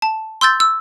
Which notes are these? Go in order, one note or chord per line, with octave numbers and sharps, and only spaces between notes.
A5
C6 E6 G6 A6
E6